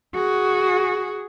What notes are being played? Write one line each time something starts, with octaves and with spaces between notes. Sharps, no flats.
F#4 G#4